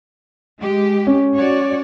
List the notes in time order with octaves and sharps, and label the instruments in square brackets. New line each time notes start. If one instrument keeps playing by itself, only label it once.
[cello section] G#3 G4
[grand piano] C#4
[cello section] F#4 C#5 D5